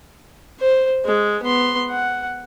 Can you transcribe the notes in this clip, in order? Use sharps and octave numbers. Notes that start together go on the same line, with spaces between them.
C5
G#3
B3 C6
F#5